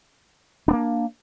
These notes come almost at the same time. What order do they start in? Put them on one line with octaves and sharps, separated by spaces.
D4 B3 A#3